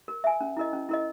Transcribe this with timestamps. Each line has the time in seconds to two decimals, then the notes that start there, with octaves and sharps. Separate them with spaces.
0.08 A#4
0.24 E5 G#5
0.41 C#4
0.57 E4 A#4 D#5
0.73 C#4
0.89 E4 A#4 D#5